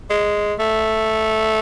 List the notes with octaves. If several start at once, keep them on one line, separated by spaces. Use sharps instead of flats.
G#3
A3